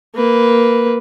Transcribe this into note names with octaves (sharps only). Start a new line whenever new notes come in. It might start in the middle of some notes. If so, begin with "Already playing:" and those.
A#3 B4